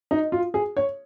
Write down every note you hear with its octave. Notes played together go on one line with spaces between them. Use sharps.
D#4
F4
G#4
C#5